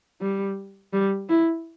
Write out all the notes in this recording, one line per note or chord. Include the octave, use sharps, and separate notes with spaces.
G3
G3
E4